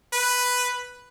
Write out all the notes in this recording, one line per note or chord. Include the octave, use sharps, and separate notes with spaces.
B4